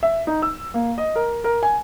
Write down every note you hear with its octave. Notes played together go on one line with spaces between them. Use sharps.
E5
D#4
E6
A#3
D#5
A#4
A#4
G#5